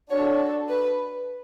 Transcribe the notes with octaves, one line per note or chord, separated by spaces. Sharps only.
D4 F#4 A4 C#5
B4